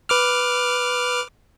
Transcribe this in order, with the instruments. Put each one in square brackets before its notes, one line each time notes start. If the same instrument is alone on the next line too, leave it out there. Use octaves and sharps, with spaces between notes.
[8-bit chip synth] B4 D6 F6